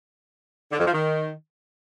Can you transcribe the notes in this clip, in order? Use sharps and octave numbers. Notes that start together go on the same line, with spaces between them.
D3
F2
F3
D#3